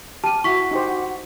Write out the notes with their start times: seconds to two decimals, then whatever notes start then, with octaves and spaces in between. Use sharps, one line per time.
0.24 G4 A5 F6 D#7
0.44 E4 F#4 F#5 C#6 B6
0.71 D#4 G4 C5